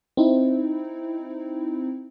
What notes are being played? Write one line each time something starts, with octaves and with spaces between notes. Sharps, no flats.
C4 D#4 E4